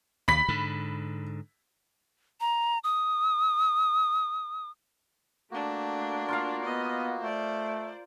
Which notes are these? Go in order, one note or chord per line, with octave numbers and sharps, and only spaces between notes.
D#2 B5 B6
G#2 D3
A#5
D#6
A3 A#3 D4 F#4
F4 A#4 F5
B3 D#5
A3 C5 D5